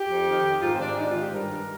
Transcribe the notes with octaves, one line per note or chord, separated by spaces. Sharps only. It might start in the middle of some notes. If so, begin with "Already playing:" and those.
Already playing: G4
F2
D#3
D#3
G#2 F4
C4
G#2 D4
D#3 D#4
F4
D#3
G4
G2 A#4
G2